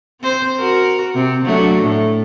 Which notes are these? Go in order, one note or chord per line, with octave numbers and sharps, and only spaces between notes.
C4 C5
F#4 A#4
C3 C4
F#3 A3 D4
A2